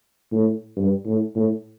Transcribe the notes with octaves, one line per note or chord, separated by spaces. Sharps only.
A2
G2
A2
A2